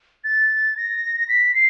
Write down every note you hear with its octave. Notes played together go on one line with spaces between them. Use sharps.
A6
A#6
B6
C7